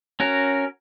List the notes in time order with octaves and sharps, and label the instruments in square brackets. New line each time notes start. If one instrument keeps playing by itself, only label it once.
[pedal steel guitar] C#4 F#4 A#4